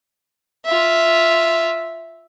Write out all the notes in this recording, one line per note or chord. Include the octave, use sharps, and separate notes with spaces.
F4 E5